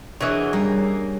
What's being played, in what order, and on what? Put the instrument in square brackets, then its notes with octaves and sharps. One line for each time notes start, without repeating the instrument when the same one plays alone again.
[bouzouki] E3 F#3 [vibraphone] D4 G#4 C#5 [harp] A#4 D#5
[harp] G3 C#4 [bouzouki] A#3